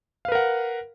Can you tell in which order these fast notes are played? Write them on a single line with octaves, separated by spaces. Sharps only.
F5 B4 A#4 F#5